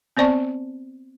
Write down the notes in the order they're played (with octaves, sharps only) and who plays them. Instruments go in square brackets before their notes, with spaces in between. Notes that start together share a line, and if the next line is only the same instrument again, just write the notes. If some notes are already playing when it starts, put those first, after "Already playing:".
[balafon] B3 C4 C5 D5 A5 C#6